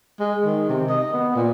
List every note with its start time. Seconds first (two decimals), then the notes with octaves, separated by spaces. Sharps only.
0.20 G#3
0.45 D#3
0.69 C3
0.89 D#5
1.13 B3
1.36 A#2